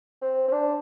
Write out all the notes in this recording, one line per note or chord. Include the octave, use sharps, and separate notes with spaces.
C4
C4
D4